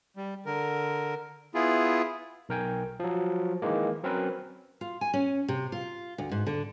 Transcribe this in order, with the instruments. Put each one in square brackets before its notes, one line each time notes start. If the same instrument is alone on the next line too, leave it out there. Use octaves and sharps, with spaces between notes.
[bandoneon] G3
D3 A#4
B3 E4 F4 G#4
[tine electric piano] B1 A#4 G5 G#5
F3 F#3
D#3 E3 G#3 A#3
F#3 C4 C#4 A#4 B4
[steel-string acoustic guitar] F4
G#5
C#4
C3
F4
D2
G#2
D3